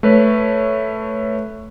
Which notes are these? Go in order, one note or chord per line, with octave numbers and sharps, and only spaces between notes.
A3 B4 C#5